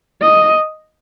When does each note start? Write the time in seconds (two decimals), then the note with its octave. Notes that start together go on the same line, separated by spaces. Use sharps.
0.21 D#5